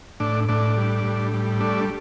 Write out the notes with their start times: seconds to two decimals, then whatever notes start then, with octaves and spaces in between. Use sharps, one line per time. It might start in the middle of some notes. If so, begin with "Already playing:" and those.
0.20 A2 D4
0.49 A2 D4
0.77 G3
1.04 A2
1.34 G3
1.61 A3 D4